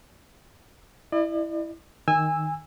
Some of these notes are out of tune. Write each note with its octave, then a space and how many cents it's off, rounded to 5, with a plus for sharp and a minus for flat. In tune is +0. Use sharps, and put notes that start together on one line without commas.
E4 +0 D5 +45
D#3 +0 G#5 -20 E6 +0